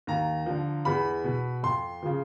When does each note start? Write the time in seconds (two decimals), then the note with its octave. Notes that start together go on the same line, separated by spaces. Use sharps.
0.07 D#2 A#5
0.46 D3 F3
0.85 E2 B5
1.24 B2
1.63 F2 C6
2.03 C#3 F3